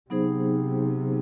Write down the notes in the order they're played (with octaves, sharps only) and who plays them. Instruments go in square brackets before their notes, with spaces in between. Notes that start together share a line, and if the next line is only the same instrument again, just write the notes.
[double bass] C3 [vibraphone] F#3 B3 D#4 G#4 C5